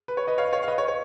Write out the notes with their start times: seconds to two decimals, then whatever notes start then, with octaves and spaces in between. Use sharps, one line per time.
0.08 B4
0.17 C#5
0.27 B4 D#5
0.38 C#5 F5
0.53 C#5 F5
0.63 F5
0.68 B4 D#5
0.78 C#5
0.88 C#5